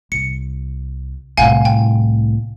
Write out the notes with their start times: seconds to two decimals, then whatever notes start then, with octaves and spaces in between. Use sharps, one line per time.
0.12 C2 C#7
1.37 C2 A2 F5 F#5 G#5
1.65 G5